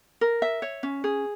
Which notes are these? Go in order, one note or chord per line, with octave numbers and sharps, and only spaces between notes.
A#4
E5
C#5
C#4
G#4